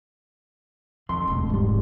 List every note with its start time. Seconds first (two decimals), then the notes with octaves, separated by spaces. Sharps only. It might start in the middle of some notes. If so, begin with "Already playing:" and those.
1.09 F2 D#3 C6
1.28 E1 D2
1.50 G#2 G3